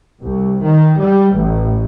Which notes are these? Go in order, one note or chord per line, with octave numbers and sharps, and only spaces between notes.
C2
D#3
G3
A1